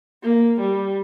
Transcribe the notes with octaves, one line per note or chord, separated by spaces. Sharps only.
A#3
G3